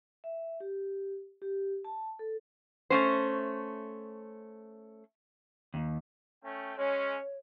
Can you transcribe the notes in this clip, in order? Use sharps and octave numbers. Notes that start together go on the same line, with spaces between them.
E5
G4
G4
A5
A4
A3 C#4 C5
D#2
A3 C#4 G5
G#3 C#4 C#5